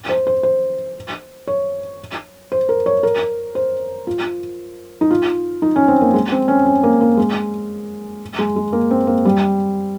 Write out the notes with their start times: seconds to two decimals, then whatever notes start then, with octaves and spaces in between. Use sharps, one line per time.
0.09 C5
0.27 C5
0.43 C5
1.47 C#5
2.52 C5
2.69 A#4
2.86 C#5
3.03 A#4
3.55 C5
4.07 F4
5.01 D#4
5.11 F4
5.62 D#4
5.76 C#4
5.88 C4
6.01 A#3
6.14 G#3
6.32 C4
6.48 C#4
6.66 C#4
6.83 A#3
7.01 A#3
7.17 G#3
8.39 G#3
8.56 G#3
8.73 A#3
8.91 C4
9.07 A#3
9.25 G3